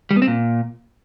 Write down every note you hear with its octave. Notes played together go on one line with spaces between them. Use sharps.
G3
B3
C4
A#2